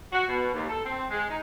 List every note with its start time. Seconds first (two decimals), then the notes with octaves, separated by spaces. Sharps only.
0.12 F#4
0.27 B2
0.52 D#2
0.68 A4
0.84 C4
1.10 G#3
1.28 D#4